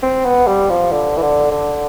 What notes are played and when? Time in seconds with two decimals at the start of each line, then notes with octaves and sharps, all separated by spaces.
0.02 C4
0.25 B3
0.47 G3
0.70 F3
0.91 D3
1.17 E3
1.22 D3
1.51 D3